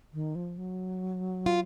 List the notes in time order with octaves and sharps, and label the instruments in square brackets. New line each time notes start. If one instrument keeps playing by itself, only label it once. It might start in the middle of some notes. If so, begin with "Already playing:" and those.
[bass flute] D#3
F3
F#3
[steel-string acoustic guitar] F4